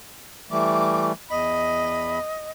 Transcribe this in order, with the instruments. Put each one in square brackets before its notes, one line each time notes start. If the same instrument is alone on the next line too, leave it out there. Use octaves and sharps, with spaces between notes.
[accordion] E3 G3 A3 [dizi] D6
[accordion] E2 B5 [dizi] D#5